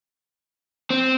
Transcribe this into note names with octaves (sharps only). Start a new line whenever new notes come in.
C4